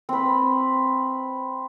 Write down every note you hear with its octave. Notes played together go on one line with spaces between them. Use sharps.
C4 B4